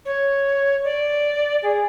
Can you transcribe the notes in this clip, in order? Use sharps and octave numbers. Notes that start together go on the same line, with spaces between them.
C#5
D5
G#4